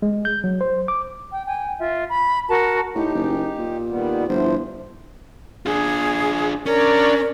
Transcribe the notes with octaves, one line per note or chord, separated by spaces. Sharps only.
G#3
G6
F#3
C5
D6
G5
G5 G#5
F4 E5
B5
F#4 A#4 A5
A2 D#4 G4
F#1
A#2
D#3 G3 B3
G1 E3 F3 C5
D4 F4 G#4
C#4 D4 A#4 C#5 D5